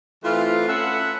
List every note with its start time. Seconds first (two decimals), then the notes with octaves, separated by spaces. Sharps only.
0.24 E3 A3 C4 F4
0.68 A3 C#4 B4 E5 F#5